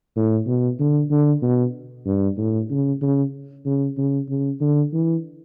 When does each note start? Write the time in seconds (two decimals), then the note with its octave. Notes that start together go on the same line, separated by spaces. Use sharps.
0.16 A2
0.47 B2
0.80 D3
1.11 D3
1.42 B2
2.06 G2
2.37 A2
2.71 C#3
3.02 C#3
3.66 C#3
3.97 C#3
4.29 C#3
4.61 D3
4.93 E3